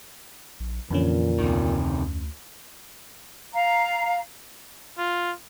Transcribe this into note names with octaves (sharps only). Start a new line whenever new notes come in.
A#1
F2 A#2 D3 E3 C#4
D2 C3 D#3
F5 A#5
F4